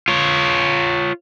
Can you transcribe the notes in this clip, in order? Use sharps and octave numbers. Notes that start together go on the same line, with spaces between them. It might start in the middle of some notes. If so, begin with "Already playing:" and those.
F4 C#5